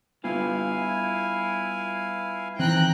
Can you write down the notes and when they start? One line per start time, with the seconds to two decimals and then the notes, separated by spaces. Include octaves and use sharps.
0.24 G3 B3 E4 F4 F5 G#5
2.59 D#3 E3 C4 G5 A#5 F#6